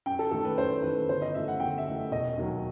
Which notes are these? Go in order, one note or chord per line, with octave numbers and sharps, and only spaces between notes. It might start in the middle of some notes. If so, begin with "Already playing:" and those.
F#2 G5
A4
D#3 A3 A4
B4
F#2 C5
D#3 A3 B4
G1 C5
D#5
F#2 E3 A3 E5
F#5
G1 G5
E5
F#2 E3 A3
E1 D#5
D#2 D#3 F#3